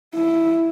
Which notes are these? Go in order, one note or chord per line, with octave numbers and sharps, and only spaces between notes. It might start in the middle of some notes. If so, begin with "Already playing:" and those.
E4